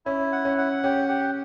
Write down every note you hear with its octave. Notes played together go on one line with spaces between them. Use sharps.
C#4 E4
F#5
C#4
F#5
C#4 G4
G4